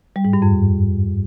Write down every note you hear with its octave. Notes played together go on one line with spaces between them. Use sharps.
G3
G#2
G2
F2